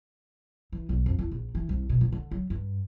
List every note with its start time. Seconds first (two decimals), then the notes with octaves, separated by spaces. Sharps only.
0.72 E3
0.89 B1
1.06 F2
1.19 E2
1.31 A#1
1.55 E3
1.69 C2
1.89 B2
2.01 C#2
2.12 D3
2.31 F#3
2.50 G2